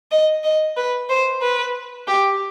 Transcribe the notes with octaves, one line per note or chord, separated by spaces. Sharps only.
D#5
D#5
B4
C5
B4
G4